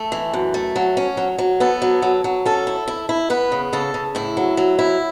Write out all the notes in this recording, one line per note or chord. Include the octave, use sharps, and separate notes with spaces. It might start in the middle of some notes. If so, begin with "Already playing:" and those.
Already playing: A3 A4
E3
F#2
A3
F#3
C#4
F#3
F#3
B3 A4
F#3
F#3
F#3
C#4 A4
E4
E4
E4
B3 B4
C#3
C#3 A4
C#3
A2 E4
F#3
F#3
E4